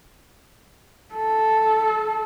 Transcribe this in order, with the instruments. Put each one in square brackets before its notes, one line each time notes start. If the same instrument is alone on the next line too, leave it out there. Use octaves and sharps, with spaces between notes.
[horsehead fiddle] A4